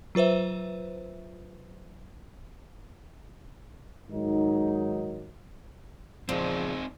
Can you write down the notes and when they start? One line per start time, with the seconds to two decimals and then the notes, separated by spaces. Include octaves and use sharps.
0.15 F#3 F4 B4 C5 E5
4.10 G#2 D#3 F#3 D#4
6.29 E2 A#2 C#3 F3 C4 D#4